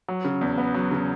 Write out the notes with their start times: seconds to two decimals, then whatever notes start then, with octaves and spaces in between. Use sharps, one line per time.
0.08 F#3
0.24 C#3
0.41 E2
0.58 B3
0.74 F#3
0.91 C#3